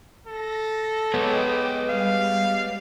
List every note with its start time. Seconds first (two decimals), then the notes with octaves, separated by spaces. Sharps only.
0.27 A4 A#6
1.14 G#3 B3 B4 C#5 D#5 G5 D6
1.89 G3 F5